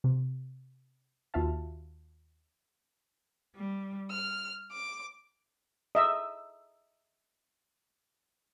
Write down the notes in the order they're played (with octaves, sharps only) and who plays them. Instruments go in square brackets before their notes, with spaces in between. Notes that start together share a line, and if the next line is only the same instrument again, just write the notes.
[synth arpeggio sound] C3
D#2 F4 F#4 E5 F5 A5
[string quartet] G3
F6
D6
[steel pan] D#5 E5 E6